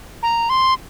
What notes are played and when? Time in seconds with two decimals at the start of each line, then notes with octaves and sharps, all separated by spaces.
0.23 A#5
0.50 C6